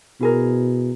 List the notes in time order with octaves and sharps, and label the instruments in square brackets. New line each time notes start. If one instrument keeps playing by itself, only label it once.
[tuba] B2 [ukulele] E4 G#4 A#4